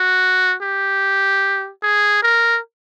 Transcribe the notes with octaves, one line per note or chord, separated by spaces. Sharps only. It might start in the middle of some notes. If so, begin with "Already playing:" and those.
Already playing: F#4
G4
G#4
A#4